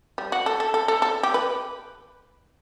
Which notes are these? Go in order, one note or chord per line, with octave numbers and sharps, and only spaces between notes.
G3
F#4
A4
A4
A4
A4
A4
G4
B4